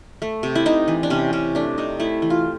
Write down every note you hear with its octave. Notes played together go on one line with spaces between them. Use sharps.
A3
C3
E4
C3 D#4
E3
D4
C3 C#4
C3 C#4
A3 D4
C3 D#4
A3 E4
E3
F4